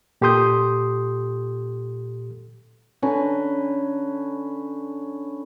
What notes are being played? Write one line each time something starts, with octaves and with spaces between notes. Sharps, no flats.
A#2 G4 A4 C6 D#6 G6
D3 C#4 B4 A#5